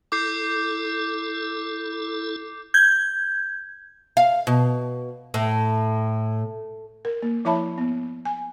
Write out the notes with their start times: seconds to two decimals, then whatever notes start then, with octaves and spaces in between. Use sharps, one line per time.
0.12 E4 A4 D6 G6 C7
2.74 G6 G#6
4.17 F5
4.47 B2
5.34 A2
7.05 A#4
7.22 A#3
7.45 F3 E4 C#5 E5 A5 B5
7.78 B3
8.25 G#5